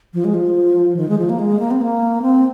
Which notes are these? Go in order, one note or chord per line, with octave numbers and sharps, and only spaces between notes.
F3
G#3
F3
D#3
G#3
F3
A#3
G#3
A#3
C4
A#3
C4